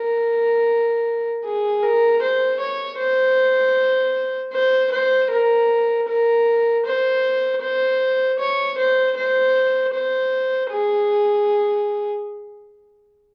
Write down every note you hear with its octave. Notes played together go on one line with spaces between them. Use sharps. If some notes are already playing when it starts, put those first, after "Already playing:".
Already playing: A#4
G#4
A#4
C5
C#5
C5
C5
C5
A#4
A#4
C5
C5
C#5
C5
C5
C5
G#4